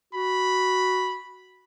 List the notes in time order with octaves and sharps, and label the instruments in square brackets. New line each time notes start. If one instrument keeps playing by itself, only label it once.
[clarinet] F#4 [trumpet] B5